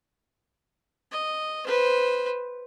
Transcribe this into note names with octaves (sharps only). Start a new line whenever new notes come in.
D#5
B4 C5